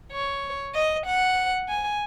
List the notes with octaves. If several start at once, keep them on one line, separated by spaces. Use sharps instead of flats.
C#5
D#5
F#5
G#5